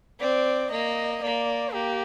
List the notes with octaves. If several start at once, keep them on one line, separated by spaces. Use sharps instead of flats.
C4 D5
A#3 D#5
A#3 D5
A#3 G4